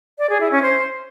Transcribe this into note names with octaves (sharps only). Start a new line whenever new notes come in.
D5
G#4
E4
C#4
C5